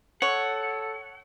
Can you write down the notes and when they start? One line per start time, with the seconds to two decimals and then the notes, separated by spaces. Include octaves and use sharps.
0.22 A4 C#5 F#5